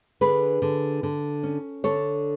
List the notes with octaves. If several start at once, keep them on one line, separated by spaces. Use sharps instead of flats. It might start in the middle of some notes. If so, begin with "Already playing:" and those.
D3 G#4 B4
D3
D3
C#4
D3 A4 C#5